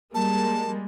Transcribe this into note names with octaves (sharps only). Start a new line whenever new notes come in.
G3 G#3 A#3 A5